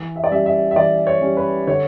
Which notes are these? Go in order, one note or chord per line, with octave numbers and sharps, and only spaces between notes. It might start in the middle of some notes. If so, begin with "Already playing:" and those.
Already playing: E3
E5
D5
G3 C#4 E5
E5
E5
E3 D5
C#5
G3 C#4
B4
D3 C#5